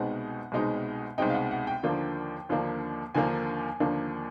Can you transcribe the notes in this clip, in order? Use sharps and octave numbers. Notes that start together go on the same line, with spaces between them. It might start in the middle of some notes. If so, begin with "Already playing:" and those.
Already playing: C2 B2 G#3 C4 D#4 F#5
C2 B2 G#3 C4 D#4
C2 B2 G#3 C4 D#4 G5
F5
F#5
F#5
G5
D#2 D3 F3 A#3 D4
D#2 D3 F3 A#3 D4
D#2 D3 F3 A#3 D4 G#5
D#2 D3 F3 A#3 D4